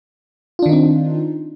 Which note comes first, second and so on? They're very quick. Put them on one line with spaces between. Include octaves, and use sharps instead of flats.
F4 D4 D#3 D#4 C4